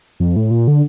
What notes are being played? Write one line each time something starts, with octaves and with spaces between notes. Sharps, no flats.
F2
A2
A#2
D3